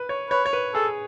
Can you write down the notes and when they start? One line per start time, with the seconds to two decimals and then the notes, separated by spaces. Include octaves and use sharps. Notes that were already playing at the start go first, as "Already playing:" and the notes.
Already playing: B4
0.09 C#5
0.30 B4 C#5
0.46 C#5
0.53 B4
0.74 G#4 A4